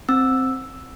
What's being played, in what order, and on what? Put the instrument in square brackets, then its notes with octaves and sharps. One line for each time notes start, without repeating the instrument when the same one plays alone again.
[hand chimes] C4 E6